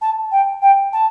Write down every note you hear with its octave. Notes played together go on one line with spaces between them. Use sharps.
A5
G5
G5
A5